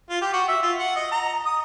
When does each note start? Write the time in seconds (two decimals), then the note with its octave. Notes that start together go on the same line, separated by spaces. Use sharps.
0.10 F4
0.22 G4
0.33 F#4
0.48 E5
0.63 F4
0.79 F#5
0.96 D#5
1.12 A#5
1.46 D#6